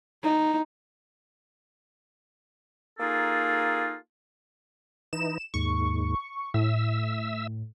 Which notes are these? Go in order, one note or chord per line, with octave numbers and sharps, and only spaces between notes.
D#4
A#3 D#4 F4 G#4 A4
E3 D#4 E7
D#2 G#2 C#6
A2 E5 E6